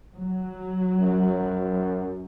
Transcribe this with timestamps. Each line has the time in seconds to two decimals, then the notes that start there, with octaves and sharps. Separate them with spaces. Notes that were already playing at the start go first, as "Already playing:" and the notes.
0.16 F#3
0.99 F#2